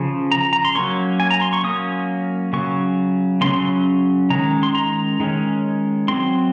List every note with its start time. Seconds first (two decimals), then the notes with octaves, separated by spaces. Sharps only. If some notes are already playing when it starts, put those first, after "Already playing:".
Already playing: C#3 F3
0.32 A#5
0.53 A#5
0.65 C6
0.75 F#3 A#3 C#4 C#6
1.20 G#5
1.30 A#5
1.42 C6
1.53 C#6
1.64 F#3 A#3 C#4 D#6
2.53 C#3 F#3 C#6
3.41 A#3 C#4 C6
3.45 C#3 F#3
4.30 D#3 G#3 C#4 A#5
4.63 C6
4.75 A#5
5.20 D#3 G#3 C#4
6.08 F#3 C4 C6